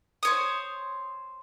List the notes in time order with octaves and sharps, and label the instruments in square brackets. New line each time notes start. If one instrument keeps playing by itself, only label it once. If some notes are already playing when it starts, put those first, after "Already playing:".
[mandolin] C5 C#5 D#6